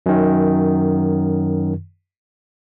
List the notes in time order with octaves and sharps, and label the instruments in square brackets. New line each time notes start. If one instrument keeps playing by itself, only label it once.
[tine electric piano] F#2 D#3